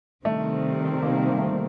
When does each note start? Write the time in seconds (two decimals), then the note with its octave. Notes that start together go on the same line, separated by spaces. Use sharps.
0.25 C3 D#3 G3 A3 C4
1.03 A#3
1.29 A#3
1.37 A3
1.46 A#3